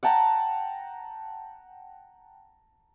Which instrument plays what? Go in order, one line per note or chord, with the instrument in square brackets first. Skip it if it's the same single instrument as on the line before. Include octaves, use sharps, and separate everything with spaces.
[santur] F#5 G5 A5 A#5